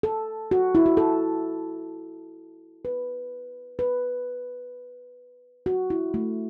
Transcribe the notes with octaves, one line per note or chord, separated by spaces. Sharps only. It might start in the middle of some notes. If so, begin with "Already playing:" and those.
A4
F#4
E4
F#4
A4
B4
B4
F#4
E4
A3